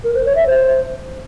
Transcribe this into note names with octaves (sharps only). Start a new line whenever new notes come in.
A#4
C5
C#5
E5
C5